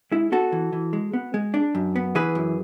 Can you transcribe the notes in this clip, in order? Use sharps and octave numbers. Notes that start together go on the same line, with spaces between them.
G#3 E4
B3 F#4 A4
E3
E3
G#3
B3
G#3
D4
F#2
B3
E3 G#4 B4
F#2